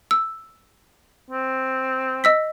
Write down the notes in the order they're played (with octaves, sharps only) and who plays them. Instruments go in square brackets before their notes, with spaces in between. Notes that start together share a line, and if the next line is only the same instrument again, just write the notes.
[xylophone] E6
[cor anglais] C4
[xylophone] D#5 E6 B6